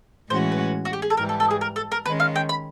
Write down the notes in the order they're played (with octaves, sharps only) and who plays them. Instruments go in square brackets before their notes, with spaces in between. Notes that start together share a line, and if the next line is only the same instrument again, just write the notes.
[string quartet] A2 E3 G#3 C#4 F#4 [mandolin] C5
[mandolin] B4
F#4
G4
G#4
A4
[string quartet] G#2 E3 G3 [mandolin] A#4
[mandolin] A4
A4
G#4
A#4
A4
A#4
[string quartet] D#3 G#3 C#4 [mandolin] B4
[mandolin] F5
G5
B5